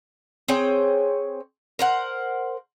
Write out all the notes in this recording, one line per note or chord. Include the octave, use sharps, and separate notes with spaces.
C4 G#4 C#5 G5
A#4 C5 F#5